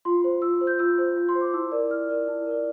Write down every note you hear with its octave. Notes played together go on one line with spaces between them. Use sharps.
F4 C6
C5
F4 E6
C5
G6
F4 E6
C5
F4
C6
C5
D6
E4 E6
A#4 D5
E4 F6
A#4 D5
E4
A#4 D5